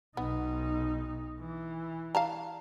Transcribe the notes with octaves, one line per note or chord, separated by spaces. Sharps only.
B1 B3 D#4
E3
F5 A5 A#5